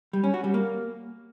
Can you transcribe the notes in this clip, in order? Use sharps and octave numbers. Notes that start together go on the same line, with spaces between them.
G3
C#4
F#4
G3
A#3